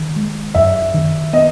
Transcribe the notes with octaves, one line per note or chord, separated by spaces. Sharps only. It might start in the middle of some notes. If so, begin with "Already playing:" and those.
Already playing: D#3
G#3
F#2 E5
D#3
B3 D#5